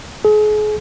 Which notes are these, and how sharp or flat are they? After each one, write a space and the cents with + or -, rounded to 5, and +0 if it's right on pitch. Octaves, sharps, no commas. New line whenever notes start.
G#4 +35